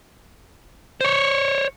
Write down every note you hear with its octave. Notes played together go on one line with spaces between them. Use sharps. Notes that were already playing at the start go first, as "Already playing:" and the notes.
C5 C#5